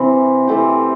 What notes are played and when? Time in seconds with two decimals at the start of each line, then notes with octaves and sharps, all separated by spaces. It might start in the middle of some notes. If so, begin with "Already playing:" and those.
Already playing: C3 E3 C4
0.47 E3 A3 C4 G4